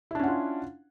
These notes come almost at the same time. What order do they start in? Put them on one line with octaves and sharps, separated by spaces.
E4 D4 C#4 F#5 F4